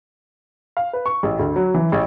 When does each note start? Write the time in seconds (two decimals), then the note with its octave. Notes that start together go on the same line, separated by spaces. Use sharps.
0.77 F5
0.93 B4
1.06 C#6
1.23 A1
1.39 D2
1.56 F#3
1.74 E3
1.92 A1